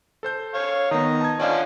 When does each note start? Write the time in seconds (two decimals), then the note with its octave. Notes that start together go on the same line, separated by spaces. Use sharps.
0.23 A4 C5 G6
0.54 C#5 F5
0.91 D#3 B3 D#5 A#5
1.21 A5 G#6
1.40 D3 F3 C#4 D5 D#5 F5